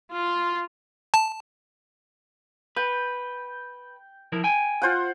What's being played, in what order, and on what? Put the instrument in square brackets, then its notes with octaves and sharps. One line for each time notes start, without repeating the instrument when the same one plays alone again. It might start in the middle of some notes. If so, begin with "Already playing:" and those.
[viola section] F4
[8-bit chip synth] A5
[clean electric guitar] B4 [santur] G5
[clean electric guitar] F3 E4 A#4
G5 G#5
[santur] F4 C5 F#5